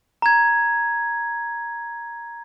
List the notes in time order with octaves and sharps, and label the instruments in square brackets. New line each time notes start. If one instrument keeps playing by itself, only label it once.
[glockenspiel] A#5 G#6